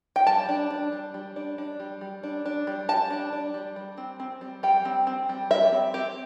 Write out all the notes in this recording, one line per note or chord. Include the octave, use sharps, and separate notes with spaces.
G5
G3 A5
D4
D4
G3
G3
D4
D4
G3
G3
D4
D4
G3
G3 A5
D4
D4
G3
G3
C4
C4
G3
G3 G5
C4
C4
G3
G3 E5
C4
C4 G4